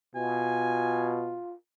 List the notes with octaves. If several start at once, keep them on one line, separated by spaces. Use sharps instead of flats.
B2 F4 G#5